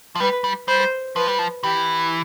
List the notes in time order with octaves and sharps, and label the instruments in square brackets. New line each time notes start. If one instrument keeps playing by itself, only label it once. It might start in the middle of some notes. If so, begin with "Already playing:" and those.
[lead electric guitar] F3
[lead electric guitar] G3 [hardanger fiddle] B4
[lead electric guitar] G3
[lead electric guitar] G3 [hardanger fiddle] C5
[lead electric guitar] F3 [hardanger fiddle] B4
[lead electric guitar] G3
F3
[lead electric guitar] E3 [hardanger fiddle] G4